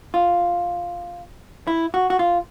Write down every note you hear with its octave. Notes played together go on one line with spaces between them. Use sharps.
F4
E4
F#4
F#4
F4